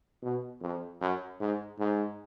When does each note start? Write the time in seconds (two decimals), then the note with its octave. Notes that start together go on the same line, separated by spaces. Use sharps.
0.23 B2
0.61 F2
1.01 F#2
1.40 G#2
1.79 G#2